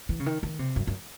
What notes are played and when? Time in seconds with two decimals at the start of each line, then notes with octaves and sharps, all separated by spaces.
0.09 E3
0.20 C#3
0.26 D#3
0.43 D#3
0.59 C3
0.76 F#2
0.87 F#2